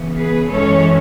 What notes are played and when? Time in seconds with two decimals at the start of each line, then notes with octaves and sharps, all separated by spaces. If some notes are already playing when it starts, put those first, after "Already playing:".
Already playing: C#3 E3 B3
0.18 G#4 B4
0.50 F#2 E3 G#3 C#4 A4 C#5